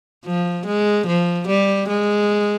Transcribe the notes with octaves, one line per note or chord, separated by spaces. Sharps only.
F3
G#3
F3
G3
G#3